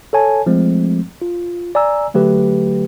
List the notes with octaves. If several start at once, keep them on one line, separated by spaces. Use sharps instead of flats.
A4 C#5 G#5 A5
F3 G#3 A3 C4
F4
D5 G#5 A#5 E6
D3 F#3 A3 G4 B4